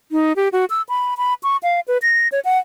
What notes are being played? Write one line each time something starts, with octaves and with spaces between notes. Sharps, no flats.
D#4
G4
F#4
E6
B5
B5
C#6
F5
B4
A#6
C#5
F#5